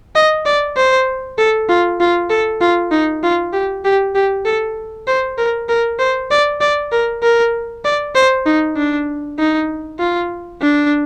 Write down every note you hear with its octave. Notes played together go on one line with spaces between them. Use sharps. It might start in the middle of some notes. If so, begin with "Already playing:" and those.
D#5
D5
C5
A4
F4
F4
A4
F4
D#4
F4
G4
G4
G4
A4
C5
A#4
A#4
C5
D5
D5
A#4
A#4
D5
C5
D#4
D4
D#4
F4
D4